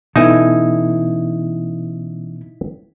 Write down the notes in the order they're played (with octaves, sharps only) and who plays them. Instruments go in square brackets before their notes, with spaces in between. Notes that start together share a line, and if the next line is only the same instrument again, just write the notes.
[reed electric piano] B2 B3 [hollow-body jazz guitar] E3 C#4 A4 [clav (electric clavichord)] D#4 G#5 [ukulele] E4